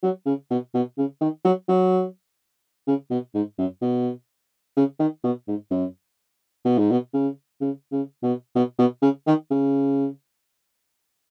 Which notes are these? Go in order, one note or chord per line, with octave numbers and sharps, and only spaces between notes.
F#3
C#3
B2
B2
C#3
D#3
F#3
F#3
C#3
B2
G#2
F#2
B2
C#3
D#3
B2
G#2
F#2
B2
G#2
B2
C#3
C#3
C#3
B2
B2
B2
C#3
D#3
C#3